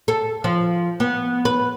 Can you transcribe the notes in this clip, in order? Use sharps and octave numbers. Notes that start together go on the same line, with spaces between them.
A4
F3
B3
B4